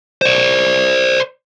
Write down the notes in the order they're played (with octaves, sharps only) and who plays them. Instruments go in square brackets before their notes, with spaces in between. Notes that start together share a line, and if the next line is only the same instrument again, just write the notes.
[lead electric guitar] C5 D5